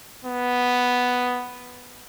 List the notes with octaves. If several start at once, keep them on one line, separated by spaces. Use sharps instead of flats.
B3